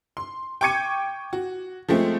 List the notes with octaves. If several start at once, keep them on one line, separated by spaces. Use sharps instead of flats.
C6
G5 C#6 D6 G#6 C#7 D#7
F#4
F3 G#3 A3 C4